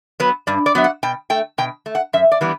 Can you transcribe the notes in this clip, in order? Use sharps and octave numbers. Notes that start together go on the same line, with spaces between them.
F#3 B3 B4
G2 D5
D5
F#3 B3 E5
F#5
B2 G5
A3 G5
B2 G5
A3
F#5
F#2 E5
D5
E3 G3 B3